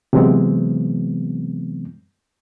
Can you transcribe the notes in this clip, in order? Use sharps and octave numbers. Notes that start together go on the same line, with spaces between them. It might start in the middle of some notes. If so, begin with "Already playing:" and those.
C3 E3 F#3 G#3 B3 C4